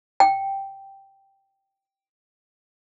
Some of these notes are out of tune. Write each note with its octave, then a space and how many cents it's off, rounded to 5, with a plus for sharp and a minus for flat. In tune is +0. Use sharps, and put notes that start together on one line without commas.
G5 -5